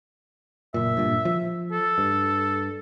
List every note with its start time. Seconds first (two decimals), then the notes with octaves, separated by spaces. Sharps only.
0.74 F#1 A#2 E5
0.97 G2 A#2
1.25 F3
1.72 A4
1.98 G2